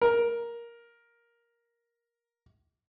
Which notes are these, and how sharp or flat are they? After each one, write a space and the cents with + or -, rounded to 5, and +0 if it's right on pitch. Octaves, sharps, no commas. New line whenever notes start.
A#4 +10